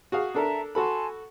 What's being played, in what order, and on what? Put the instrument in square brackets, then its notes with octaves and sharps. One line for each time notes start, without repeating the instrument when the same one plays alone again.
[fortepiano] F#4 G#4 F5
[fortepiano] D4 A4 A#4 [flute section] E5 A5 A#5
[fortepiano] F#4 A4 B5 [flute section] G#5 A5 C6